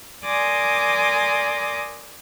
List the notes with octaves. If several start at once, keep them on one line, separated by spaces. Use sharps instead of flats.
A#4 D5 G#5 C6 D6 D#6